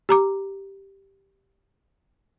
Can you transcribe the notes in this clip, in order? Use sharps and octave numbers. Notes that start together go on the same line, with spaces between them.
G4 A#5 D6